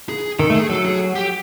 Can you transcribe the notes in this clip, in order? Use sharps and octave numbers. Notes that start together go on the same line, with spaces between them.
G#4
D#3 A4
A3
G#4
F#3 A4
G#4
G4